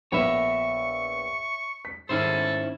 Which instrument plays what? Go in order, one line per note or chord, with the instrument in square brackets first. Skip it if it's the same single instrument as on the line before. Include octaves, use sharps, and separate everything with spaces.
[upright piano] A#1 B3 B5 [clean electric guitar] C#5 E5 [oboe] C#6
[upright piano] B6
[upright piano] G#2 D#3 [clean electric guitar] C#4 E4 C5 [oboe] A4